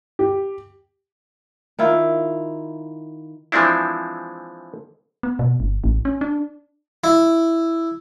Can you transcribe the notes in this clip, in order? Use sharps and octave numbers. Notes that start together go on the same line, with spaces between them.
G4
D#3 E4 F4
E3 F3 G#3 C4 D4 E4
B3
B2
G1
A1
C#4
D4
E4